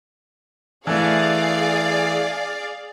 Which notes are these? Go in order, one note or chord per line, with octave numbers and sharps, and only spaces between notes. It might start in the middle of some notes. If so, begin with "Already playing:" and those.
E3 A3 G#4 D5 F5